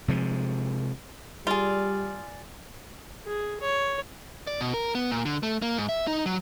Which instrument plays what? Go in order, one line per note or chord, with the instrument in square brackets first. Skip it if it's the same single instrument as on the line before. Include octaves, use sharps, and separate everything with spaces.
[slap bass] C3 F3 G#3
[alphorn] G3 [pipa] F4 [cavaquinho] G#4 D5
[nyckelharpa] G#4
C#5
[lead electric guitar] D5
B2
A#4
B3
A#2
D3
A3
A#3
G#2
E5
D#4
F#3